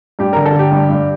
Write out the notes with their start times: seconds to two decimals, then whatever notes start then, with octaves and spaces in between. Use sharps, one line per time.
0.19 G2 G4
0.33 D3 A#4
0.46 A4
0.54 D3 G4
0.71 G2
0.89 G2